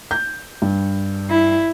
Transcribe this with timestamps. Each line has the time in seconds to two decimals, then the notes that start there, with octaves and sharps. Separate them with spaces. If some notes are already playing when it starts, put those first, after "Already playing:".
0.11 G6
0.62 G2
1.30 E4